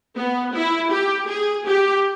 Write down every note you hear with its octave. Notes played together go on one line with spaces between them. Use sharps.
B3
E4
G4
G#4
G4